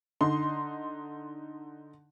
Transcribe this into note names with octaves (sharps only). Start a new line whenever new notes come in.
D3 D#4 C6